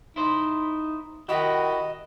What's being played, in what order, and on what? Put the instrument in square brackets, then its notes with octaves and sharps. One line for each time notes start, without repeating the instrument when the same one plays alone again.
[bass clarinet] D#4 [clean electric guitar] E4 C5
[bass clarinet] D#3 [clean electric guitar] E4 G4 [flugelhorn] F#4 [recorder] D#5